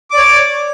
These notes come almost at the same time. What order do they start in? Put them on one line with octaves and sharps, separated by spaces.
D6 D5 C#5